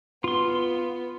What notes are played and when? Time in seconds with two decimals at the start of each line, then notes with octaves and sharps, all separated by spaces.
0.24 B3 F4 C6